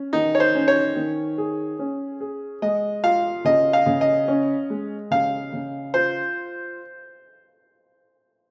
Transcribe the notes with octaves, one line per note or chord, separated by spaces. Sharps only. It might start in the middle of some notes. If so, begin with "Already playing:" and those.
Already playing: C#4
D#3 D#4
C#5
C5
C#4
C#5
D#3
G#4
C#4
G#4
G#3 D#5
F4 F5
C#3 D#5
F5
C#3
D#5
C#4
G#3
C#3 F5
C#3
F4 C5